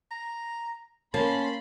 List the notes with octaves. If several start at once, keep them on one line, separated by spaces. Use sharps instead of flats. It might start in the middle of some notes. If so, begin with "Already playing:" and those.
A#5
A#3 C#4 A5 B5 C6